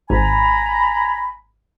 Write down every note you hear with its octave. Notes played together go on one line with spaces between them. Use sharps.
G#1 G#5 A#5 B5